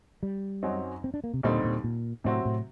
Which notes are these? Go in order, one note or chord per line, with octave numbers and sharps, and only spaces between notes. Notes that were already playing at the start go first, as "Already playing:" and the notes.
G3
F#2 F#3 C4 D#4 F#4
C4
D4
A#3
C3
D#2 A#2 D3 G3 C4 D#4
A#2
A#2
A2 C3 F#3 C4 F#4
A2